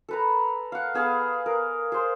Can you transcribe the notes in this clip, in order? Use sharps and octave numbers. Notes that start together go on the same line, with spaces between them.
A4 B4 A#5
F5 F#5
B3 G#4 F5 E6
A#4
G#4 C5